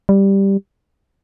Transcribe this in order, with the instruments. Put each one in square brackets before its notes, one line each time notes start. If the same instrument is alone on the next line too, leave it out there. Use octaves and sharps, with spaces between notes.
[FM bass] G3